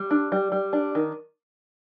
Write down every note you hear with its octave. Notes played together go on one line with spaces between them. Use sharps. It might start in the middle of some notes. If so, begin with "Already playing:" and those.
Already playing: G3
D4
G3
G3
D4
D#3